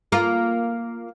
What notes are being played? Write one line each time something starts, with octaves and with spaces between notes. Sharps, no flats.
A#3 F4 A#4